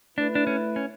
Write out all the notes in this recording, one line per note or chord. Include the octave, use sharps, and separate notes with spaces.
A3 D4 E4 B4
D4
C#4
C#4